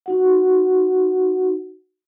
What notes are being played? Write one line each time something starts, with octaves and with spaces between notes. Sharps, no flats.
D#4 F#4 F#5